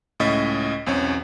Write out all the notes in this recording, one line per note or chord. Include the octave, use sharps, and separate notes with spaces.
C#2 A2 C#4 D#5 A6 B6
B1 E2 C4 C#4 C#5